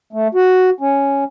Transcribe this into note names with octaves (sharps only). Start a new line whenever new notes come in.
A3
F#4
C#4